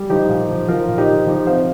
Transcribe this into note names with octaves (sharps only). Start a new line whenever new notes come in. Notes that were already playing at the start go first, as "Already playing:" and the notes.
Already playing: G3
F3 D#4 G4
A#2
F3
F3 F4 A#4
A#2
D#4 G4
F3
F3 D#4 G4
C3 C5 F5